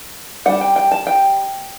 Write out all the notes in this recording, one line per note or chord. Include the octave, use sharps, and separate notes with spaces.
G3 D4 F#5
G5
G5
A5
G5